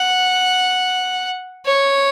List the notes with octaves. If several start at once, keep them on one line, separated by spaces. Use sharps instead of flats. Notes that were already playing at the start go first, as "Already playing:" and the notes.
Already playing: F#5
C#5